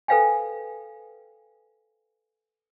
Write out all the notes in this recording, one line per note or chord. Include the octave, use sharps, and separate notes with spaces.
A4 B4 C5 F5 G5 G#5